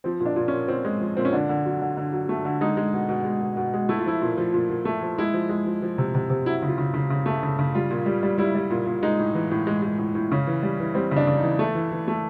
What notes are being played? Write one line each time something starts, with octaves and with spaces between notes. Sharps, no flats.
F3 C4
A#2
D4
A#2
C#4
A#2
A#2 C4
G#3
F3
A#2 C4
C#4
D3 D4
D3
F#3
D3
D3
F#3
A3
D3
G#3 D#4
G#3
B2
B2
G#3
B2
B2
G#3
A3 E4
F4
F3 E4
A#2
F3
A#2
A#2
A3
F3
G#3 E4
F3
G#3
F3
F3
C3
C3
C3
F#3 E4
C#3
F4
C#3
C#3
C#3
A3
C#3
C#3
G3 F4
A#2
G3
G3
G3 E4
G3
A#2
A#2
G#3 D#4
A2
E3
A2
G#3
G#3
A2
A2
C#3 C#4
E3
G3
E3
G3 C4
C#3
D4
C#3
D#4
E3
A3 A4
E3
E3
A3